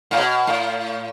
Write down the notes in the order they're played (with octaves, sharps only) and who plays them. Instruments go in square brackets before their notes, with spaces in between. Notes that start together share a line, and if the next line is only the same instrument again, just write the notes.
[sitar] A2
B2
A2